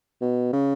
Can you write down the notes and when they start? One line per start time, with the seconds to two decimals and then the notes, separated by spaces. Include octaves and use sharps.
0.21 B2
0.53 C#3